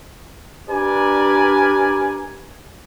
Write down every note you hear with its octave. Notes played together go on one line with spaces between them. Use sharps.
D4 G4 A#4 B4 D5 G#5